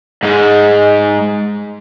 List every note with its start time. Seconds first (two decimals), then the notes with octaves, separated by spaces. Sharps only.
0.23 G#2 G#3